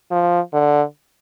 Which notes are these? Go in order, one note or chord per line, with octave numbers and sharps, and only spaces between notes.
F3
D3